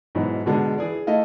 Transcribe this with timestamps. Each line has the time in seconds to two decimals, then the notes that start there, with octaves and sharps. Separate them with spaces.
0.15 G#2 B2 E3 F#3
0.46 B2 D3 G#3 D4
0.78 E3 G#4 D5
1.07 A3 E4 D#5 F5